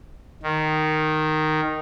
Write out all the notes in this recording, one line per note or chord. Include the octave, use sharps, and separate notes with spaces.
D#3